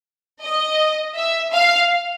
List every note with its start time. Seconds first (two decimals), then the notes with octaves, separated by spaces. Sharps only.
0.42 D#5
1.16 E5
1.52 F5